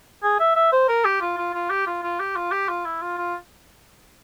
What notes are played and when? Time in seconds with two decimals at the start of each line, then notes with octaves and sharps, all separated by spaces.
0.23 G#4
0.39 E5
0.56 E5
0.72 C5
0.88 A#4
1.05 G4
1.21 F4
1.37 F4
1.54 F4
1.70 G4
1.87 F4
2.03 F4
2.20 G4
2.36 F4
2.52 G4
2.69 F4
2.85 E4
3.02 F4
3.17 F4